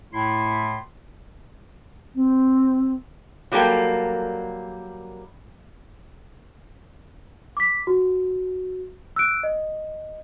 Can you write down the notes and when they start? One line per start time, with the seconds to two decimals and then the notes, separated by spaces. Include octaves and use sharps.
0.13 A2 A3 E4 C6
2.15 C4
3.52 F#3 G3 A#3 A4 G5
7.57 D6 B6
7.87 F#4
9.16 E6 F#6 D7
9.43 D#5